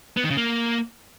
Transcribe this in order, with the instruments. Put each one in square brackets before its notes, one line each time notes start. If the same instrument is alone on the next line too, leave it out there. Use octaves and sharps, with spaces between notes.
[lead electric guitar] B3
D#3
C#3
A#3